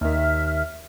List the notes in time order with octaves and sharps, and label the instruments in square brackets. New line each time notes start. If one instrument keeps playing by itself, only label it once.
[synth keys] D#2 D#3 [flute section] E5 F6